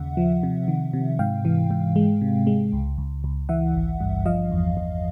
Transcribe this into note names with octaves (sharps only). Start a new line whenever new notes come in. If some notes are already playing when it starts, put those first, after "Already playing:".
Already playing: D#2 C#3 E5 F#5
F3
C3
D#3
C3
G#2 F5 G5
E3
G#2
G#3
C3
G#3
C#2
C#2
C#2
E3 E5 F#5
G#1
G2
F3 D#5 F5
E2
E2